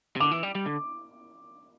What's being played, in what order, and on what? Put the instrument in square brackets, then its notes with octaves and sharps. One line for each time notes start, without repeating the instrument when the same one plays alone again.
[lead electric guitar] C3
[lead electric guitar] D3 [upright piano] D6
[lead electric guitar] E3
G3
G3
D3